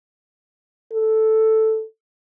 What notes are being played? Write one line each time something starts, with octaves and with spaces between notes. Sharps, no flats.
A4